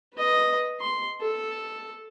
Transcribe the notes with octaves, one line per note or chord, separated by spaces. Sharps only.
B4 D#5
C6
A4